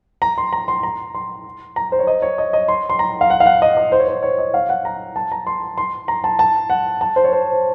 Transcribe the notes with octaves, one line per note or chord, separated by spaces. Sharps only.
A#5
C6
A#5
C6
A#5
C6
A#5
C5
C#5
D#5
C#5
D#5
D#5
C6
C6
A#5
F5
F#5
F5
F#5
D#5
D#5
C5
C#5
C5
C#5
D#5
F5
F#5
A#5
A5
A#5
C6
C6
A#5
A5
A5
F#5
A5
C5
C#5
C5